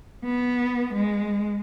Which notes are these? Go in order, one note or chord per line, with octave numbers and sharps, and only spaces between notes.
B3
G#3